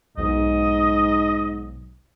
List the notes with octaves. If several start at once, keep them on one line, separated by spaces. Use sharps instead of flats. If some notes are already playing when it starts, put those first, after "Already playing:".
B1 G#2 D#5